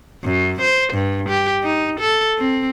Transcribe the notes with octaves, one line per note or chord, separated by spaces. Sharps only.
F#2
C5
G2
G4
D#4
A4
C4